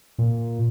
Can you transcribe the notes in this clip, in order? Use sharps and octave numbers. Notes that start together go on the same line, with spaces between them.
A#2